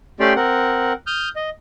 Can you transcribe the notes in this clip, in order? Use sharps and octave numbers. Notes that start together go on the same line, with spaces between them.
A3 C#4 G4 D5 G5 C6
C4 A#4 F#5
D#6 F6 G6
D#5